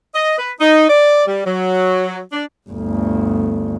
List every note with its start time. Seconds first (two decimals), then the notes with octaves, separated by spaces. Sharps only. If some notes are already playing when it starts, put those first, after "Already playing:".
0.14 D#5
0.38 B4
0.60 D#4
0.89 D5
1.27 G3
1.45 F#3
2.32 D4
2.69 G1 D2